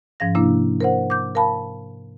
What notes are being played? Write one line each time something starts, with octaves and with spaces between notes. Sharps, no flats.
G#2 F3 C#4 F5 A#6
C3 A#3 D4 E4
A#4 C5 F#5
D6 G6
A#4 F5 A5 B5